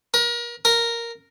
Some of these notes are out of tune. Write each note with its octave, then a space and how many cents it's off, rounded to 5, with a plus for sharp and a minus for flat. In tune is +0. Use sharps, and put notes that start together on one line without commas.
A#4 +35
A#4 +0